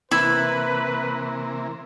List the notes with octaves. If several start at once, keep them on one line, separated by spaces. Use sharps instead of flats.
C3 E3 A#3 E4 B4